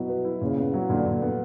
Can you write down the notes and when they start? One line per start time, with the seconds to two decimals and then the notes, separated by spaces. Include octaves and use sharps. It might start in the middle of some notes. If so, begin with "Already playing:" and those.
Already playing: B2 F#3 B3 E4
0.09 B4
0.25 E4
0.41 A#2 C#3
0.58 B3
0.74 F#3
0.89 A#2 D3
1.06 A#2
1.22 B3